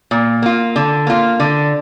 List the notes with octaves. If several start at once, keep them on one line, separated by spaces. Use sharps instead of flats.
A#2
A#3 F4
D3
A#3 F4
D3